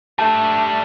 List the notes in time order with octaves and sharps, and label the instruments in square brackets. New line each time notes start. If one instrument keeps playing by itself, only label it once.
[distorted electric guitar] G3 D4 [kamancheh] A3 [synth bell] A5